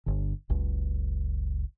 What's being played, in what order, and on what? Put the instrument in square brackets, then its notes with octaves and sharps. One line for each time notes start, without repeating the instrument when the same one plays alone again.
[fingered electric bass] G1 D3
F#1 C#2